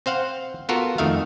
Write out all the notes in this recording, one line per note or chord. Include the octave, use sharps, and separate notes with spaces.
C4 C5 F5 F#5
B3 F4 F#4 A4 A#4
F2 D#3 A3 E5 F5